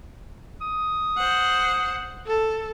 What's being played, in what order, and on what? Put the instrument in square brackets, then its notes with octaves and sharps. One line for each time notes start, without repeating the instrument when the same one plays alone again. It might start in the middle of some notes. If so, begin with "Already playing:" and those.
[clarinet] D#6
[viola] C5 F#5
A4